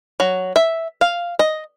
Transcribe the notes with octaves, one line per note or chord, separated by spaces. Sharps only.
F#3
E5
F5
D#5